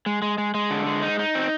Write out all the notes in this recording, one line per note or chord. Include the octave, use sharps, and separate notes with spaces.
G#3
G#3
G#3
G#3
D3
G#3
D#4
D#4
C4